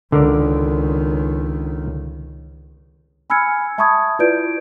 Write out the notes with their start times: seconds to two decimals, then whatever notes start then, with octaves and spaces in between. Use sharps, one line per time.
0.12 C#2 D3 D#3 A#4 D5
3.30 G#5 B5 E6 F6 G#6 C#7
3.78 E5 A5 B5 C#6 D#6 G#6
4.19 E4 F4 B4 D5 G6 D7